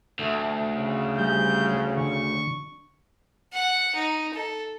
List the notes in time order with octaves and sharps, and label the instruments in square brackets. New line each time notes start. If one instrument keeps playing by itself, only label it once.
[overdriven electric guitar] D2 [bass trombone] A3
[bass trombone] C#3
[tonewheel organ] G3 [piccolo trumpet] G6
[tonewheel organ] D3 [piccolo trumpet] C#6
[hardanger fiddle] F#5
D#4
A4